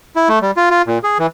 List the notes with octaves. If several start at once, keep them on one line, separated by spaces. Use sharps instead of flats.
E4
A3
G3
F4
F4
A#2
G#4
E3